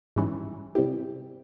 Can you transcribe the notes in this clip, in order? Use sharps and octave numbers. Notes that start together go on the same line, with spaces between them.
G#2 E3 G3 C#4
C3 G3 C4 E4 G4